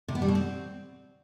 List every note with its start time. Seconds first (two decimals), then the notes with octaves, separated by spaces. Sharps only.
0.08 C3
0.15 B3
0.22 G3
0.28 B2
0.35 C4